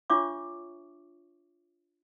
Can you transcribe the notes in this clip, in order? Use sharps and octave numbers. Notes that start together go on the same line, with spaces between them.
D4 F4 C#5 E5 C#6 D6